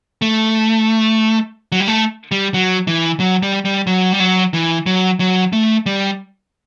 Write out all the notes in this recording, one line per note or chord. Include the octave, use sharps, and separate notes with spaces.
A3
F#3
G3
A3
G3
F#3
E3
F#3
G3
G3
F#3
G3
F#3
E3
F#3
F#3
A3
G3